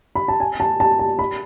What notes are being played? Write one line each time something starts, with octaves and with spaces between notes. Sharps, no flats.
B5
A5
G#5
A5
A5
A5
B5